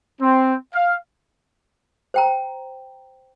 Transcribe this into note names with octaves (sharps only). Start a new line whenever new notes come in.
C4
F5
C5 G5 A#5